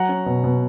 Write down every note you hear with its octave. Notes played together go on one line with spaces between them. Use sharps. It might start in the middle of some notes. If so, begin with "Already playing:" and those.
Already playing: F#3 F#5 A#5
C#4
B2
B2